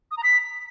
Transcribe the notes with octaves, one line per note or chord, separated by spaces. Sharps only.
D#6
A#5
B6